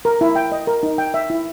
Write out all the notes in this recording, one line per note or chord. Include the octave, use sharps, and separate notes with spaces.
A#4
E4
G5
D#5
A#4
D#4
G5
E5
E4